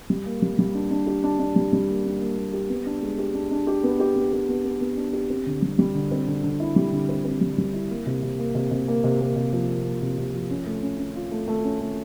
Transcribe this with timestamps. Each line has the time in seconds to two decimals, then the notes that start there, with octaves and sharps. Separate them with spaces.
0.10 G3
0.26 A#3
0.42 G3
0.59 G3
0.75 D4
0.91 D4
1.07 G4
1.24 D4
1.39 D4
1.56 G3
1.73 G3
1.88 A#3
2.05 D4
2.21 A#3
2.38 A#3
2.53 G4
2.70 B3
2.86 D4
3.03 G#3
3.18 G4
3.35 D4
3.51 D4
3.67 G4
3.84 B3
4.00 G4
4.16 B3
4.33 G4
4.49 B3
4.65 B3
4.81 B3
4.97 D4
5.13 G4
5.30 C4
5.46 D3
5.62 G3
5.79 G3
5.95 D3
6.11 C4
6.28 D3
6.44 D3
6.60 E4
6.76 G3
6.92 D3
7.09 C4
7.25 C4
7.41 G3
7.58 G3
7.74 E4
7.90 A#3
8.06 C3
8.23 C3
8.39 A#3
8.55 C3
8.71 C3
8.88 A#3
9.04 C3
9.21 A#3
9.36 C3
9.53 F3
9.69 A#3
9.85 A#3
10.02 C3
10.18 C3
10.34 F3
10.50 C#4
10.66 A3
10.82 C#4
10.98 C#4
11.15 F4
11.31 A3
11.48 A3
11.64 C#4
11.80 A3